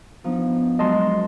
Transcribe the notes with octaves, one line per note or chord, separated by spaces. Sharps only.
F3 B3 D4 D#4
F#3 G#3 A#4 D#5 A5 C6